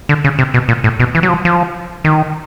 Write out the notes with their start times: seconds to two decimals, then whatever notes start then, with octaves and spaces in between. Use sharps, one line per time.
0.09 D3
0.24 C#3
0.39 C3
0.54 B2
0.69 A#2
0.84 A2
1.00 B2
1.15 E3
1.23 F#3
1.29 F3
1.45 F3
2.04 D#3